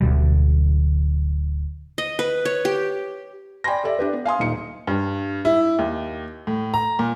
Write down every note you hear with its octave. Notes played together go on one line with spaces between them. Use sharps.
D1 D2 B2 G3
D#5
B4
C#5
G4
D5 G5 G#5 B5 C6 A#6
G4 A4 D5 E5
D4 G4 B4
B3
F5 G#5 C6 D#6
D#1 A#2 D#4 C#7
G2
E4
D#2
A2
A#5
A#2